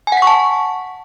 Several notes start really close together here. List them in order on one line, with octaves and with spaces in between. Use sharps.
G#5 F#5 B6 C#6 A5